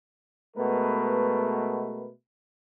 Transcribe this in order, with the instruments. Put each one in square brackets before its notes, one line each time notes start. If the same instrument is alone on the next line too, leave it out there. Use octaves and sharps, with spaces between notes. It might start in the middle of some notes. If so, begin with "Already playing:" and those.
[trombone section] B2 G#3 A3 B3 A#4 B4